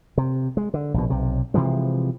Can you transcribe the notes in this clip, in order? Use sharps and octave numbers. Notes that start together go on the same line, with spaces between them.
C3
G#3
D3
A#1 B2
B1 C3
C3 E3 F3 G#3